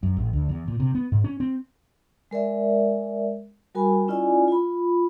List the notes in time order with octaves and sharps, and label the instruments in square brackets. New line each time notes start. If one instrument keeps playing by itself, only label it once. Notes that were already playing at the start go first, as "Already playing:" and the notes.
[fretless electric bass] F#2
A1
D2
E2
A#2
C3
B3
G#2
C#4
C4
[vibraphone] G#3 A#4 D5 E5
G3 F#4 A#4 G#5 B5
C#4 E4 F4 D5 D#5 G#5
F4 B5